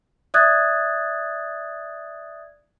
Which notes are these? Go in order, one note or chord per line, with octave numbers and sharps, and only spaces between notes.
D5 E5 D#6 F#6 G#6 A6